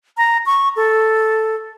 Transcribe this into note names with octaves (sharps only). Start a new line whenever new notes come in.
A#5
C#6
A4